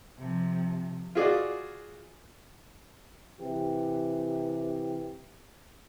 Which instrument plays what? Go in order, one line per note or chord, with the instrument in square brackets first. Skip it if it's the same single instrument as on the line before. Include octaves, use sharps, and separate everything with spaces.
[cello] C3 F3
[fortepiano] F4 F#4 G#4 D5 D#5 F5
[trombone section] C3 E3 G4